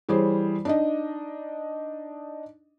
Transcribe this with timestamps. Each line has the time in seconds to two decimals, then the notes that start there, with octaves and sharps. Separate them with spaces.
0.09 E3 G3 G#4 C5 C#5
0.65 D4 D#4 D#5